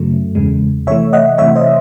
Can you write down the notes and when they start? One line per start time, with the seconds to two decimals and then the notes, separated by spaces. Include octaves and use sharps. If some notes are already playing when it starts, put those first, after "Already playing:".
Already playing: F#2 C#3 F#3 A3
0.35 E2 C#3 G#3
0.87 C3 E3 A3 C#5 E5
1.13 D#5 F#5
1.38 C3 E3 A3 C#5 E5
1.56 C5 D#5